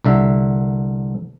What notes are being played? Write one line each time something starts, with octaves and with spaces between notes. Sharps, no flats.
C2 D3 E5